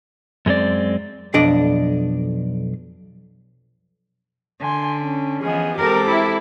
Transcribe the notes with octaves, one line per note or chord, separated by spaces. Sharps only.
F#2 G#3 C4 D5
B1 F2 D4 D5 D#5
D3 G#5 C6
C#4
E3 F3 B3 G#4 D#5
G#3 C4 G4 A4 A#4 D6
E4